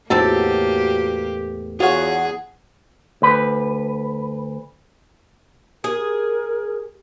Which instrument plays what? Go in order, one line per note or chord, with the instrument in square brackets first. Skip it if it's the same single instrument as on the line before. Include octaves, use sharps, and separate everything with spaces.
[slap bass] E2 A2 [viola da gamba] A#3 G4 [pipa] C4 D#4 A4 [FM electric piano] F#4
[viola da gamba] E2 G#4 [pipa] F4 C#5 [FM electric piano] F#4 F#5
[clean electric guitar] D2 B4
[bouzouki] G#4 [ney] A#4